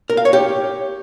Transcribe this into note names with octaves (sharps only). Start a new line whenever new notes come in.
A#4
F5
C#5
G4